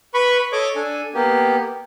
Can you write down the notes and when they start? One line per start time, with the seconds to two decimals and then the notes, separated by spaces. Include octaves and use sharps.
0.14 B4 B5 C#6
0.52 A4 C#5 D#5 D6
0.76 D4 A4 G#5
1.14 A#3 B3 G4